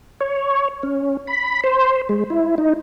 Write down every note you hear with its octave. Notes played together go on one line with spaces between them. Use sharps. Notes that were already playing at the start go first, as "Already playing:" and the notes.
C#5
C#4
B5
C5
G#3
E4
D#4